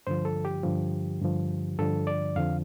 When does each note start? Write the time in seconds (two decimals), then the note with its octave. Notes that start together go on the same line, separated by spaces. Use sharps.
0.07 G2 D3 F3 C5
0.25 A4
0.45 G4
0.63 G2 D3 F3
1.22 G2 D3 F3
1.79 G2 D3 F3 A4
2.07 D5
2.36 F2 D3 F3 F5